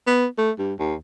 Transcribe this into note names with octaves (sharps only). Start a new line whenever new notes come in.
B3
A3
G2
D#2